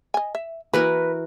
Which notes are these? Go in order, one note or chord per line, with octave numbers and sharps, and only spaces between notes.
D#5 G#5
E5
E3 A#3 F#4 A#4 B4